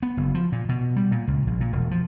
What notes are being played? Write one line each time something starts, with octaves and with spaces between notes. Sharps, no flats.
B3
F#1
F3
A#2
B2
G3
A#2
C#2
A#1
A#2
E1
F3